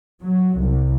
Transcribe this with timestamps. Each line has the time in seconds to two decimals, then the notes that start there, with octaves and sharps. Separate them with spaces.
0.22 F#3
0.61 C2